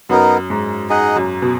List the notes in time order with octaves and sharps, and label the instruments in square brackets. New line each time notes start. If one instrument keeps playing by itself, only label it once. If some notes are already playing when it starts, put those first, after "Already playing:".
[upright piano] F#2 [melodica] B3 D#4 A#4
[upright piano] G#2
[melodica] D#4 G#4 D#5 F#5
[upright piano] F#2
B2